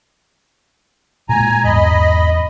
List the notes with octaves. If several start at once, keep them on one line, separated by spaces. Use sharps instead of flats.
A#2 G#3 G#5 A#5
E2 G#2 D#5 B5